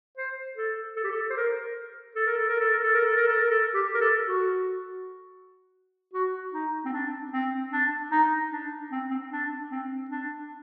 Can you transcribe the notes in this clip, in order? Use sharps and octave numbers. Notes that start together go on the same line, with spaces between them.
C5
A4
A4
G4
A4
C5
A#4
A4
A#4
A4
A#4
A4
A#4
A4
A#4
A4
A#4
A4
A#4
A4
G4
A#4
A4
F#4
F#4
D#4
C4
D4
C4
D4
D#4
D4
C4
C4
D4
C4
D4